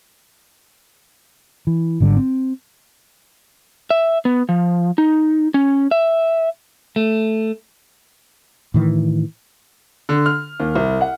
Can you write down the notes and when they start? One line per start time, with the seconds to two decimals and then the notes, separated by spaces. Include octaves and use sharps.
1.67 E3
2.00 G#1 G#2 D3 G3
2.17 C4
3.90 E5
4.25 B3
4.49 F3
4.98 D#4
5.54 C#4
5.91 E5
6.96 A3
8.74 A2 D#3 E3
10.09 D3
10.26 F6
10.60 D#2
10.75 C2
11.01 F#5